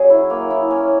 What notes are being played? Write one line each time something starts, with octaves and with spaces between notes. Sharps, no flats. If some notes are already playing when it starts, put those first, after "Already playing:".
Already playing: F#3 C#4 G#4
E4
A#3
E4
C#4